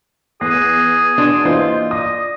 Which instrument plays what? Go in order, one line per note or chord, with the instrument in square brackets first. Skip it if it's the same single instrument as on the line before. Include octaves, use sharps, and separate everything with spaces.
[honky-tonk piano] E2 [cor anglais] G#4 [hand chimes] F#6 A#6 C7
[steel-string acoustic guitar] D4 [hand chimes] F#4 C6
[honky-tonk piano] E3 C5 [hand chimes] A#3 D#5 C7 [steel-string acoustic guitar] F4
[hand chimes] D5 A#6 [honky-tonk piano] D#6